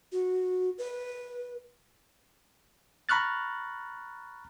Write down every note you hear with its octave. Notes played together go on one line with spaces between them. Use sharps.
F#4
B4
A#5 B5 C#6 F6 F#6 A6